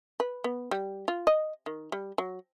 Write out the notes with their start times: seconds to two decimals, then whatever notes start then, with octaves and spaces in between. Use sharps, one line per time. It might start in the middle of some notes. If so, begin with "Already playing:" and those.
0.20 B4
0.44 B3
0.71 G3
1.08 F4
1.27 D#5
1.66 D#3
1.92 G3
2.18 F#3